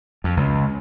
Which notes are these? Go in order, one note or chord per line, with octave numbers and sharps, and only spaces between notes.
F2
C#2